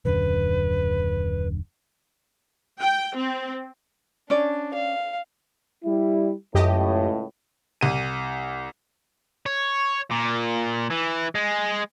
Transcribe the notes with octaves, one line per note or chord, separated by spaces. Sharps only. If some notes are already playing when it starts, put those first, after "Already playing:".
D#1 F#2 D3 B4
G5
C4
C#4 D4 D5
F5
G3 E4
C#2 F#2 A2 G4 D#5
C2 D#7
C#5
A#2
E3
G#3